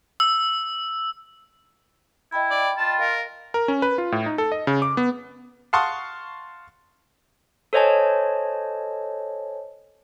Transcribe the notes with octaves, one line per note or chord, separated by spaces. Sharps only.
E6
E4 D#5 G5 B5
D5
F4 A5
A#4 D#5 F5
A#4
C#4
B4
F4
A2
D#4
A4
D#5
C#3
D6
B3
F5 F#5 A5 C6 C#6 D#6
A4 C5 C#5 D#5 G#5 A5